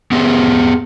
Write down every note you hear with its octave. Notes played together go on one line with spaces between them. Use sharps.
B3 G4 G#4